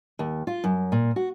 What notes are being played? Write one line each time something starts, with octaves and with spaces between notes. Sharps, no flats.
D#2
F4
F#2
A#2
F#4